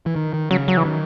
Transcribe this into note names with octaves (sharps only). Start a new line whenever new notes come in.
E3
D#3
D#3
C#3 F#3
F#3
E3
D#3